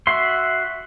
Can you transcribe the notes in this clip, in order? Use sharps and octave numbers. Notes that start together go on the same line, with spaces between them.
F#4 E5 C6